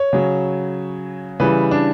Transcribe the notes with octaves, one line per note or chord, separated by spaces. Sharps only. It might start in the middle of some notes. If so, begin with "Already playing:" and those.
Already playing: C#5
C#3 F#3
C#3 E3 G3 B4
D4